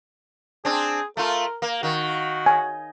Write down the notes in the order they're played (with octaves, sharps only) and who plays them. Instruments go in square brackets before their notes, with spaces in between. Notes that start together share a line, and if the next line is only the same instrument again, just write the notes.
[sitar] C4 D4 [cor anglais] G#4
[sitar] A3 F4 [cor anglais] A#4
[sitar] A#3
[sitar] D#3 [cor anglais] F#4
[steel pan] G#5